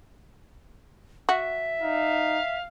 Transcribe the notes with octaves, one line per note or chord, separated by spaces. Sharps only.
F#4 E5
D#4 F5